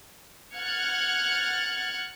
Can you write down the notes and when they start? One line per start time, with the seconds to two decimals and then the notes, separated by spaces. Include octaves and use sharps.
0.56 F#5 F6 F#6 G#6 A6 C#7